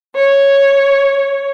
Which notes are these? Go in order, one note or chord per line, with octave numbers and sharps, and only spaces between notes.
C#5